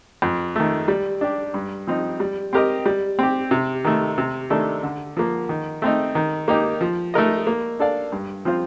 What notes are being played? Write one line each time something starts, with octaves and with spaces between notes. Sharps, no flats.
F2
D#3 A3
G3
D4 G4
G2
F3 C4 D#4
G3
C4 G4 A#4 D#5
G3
C4 G4
C3
D#3 A3
C3
D#3 A3 D4 A4
D3
F3 A#3
D#3
A3 C4 D#4
D#3
A#3 D#4 G4
F3
A3 D#4 A#4 D#5
A#3
D4 A4 D5 F5
G2
F3 C4 F4 C5